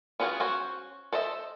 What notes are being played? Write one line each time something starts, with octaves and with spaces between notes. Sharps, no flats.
B3 C#4 F4 F#4 G#4
C#4 F#4 C5
A4 C5 D#5 E5